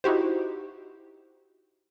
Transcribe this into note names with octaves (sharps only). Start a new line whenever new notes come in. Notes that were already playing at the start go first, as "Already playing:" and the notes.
D#4 E4 F#4 G4 C5